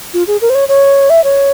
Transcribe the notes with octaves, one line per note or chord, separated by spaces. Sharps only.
F4
G#4
A#4
C5
C#5
C#5
E5
C#5